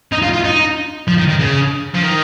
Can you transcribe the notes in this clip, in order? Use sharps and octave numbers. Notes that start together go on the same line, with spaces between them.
D#4
F4
F4
D#4
F3
D#3
D#3
C#3
F3
D#3